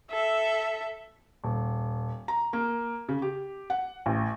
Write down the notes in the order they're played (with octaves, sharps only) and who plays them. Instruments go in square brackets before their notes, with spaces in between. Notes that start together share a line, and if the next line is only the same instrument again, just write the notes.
[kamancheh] A4 E5
[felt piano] D#1
A#5
A#3
C#3
G4
F#5
A1